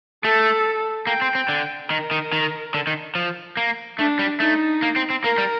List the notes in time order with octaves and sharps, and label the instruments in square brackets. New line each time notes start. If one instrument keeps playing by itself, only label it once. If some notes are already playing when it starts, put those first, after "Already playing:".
[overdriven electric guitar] A3 [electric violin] A4
[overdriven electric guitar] A#3 [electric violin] G5
[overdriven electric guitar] C4
C4
D3
[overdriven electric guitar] D#3 [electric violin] A#4
[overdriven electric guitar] D#3
D#3
D3
D#3
F3
A#3
[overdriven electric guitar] A3 [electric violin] D4
[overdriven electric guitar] G3
[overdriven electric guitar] A3 [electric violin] D#4
[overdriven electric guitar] A#3
C4
C4
[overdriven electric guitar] A#3 [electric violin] A#4
[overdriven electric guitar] G3